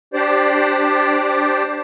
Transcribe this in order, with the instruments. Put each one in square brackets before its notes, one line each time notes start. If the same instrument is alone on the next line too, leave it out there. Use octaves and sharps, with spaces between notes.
[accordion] D4 G4 C5 D5